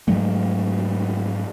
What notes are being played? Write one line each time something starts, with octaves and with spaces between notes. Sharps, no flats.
G#2 F#3 A3